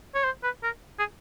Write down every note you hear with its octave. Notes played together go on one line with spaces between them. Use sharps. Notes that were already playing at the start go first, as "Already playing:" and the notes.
C#5
C5
B4
A#4
G#4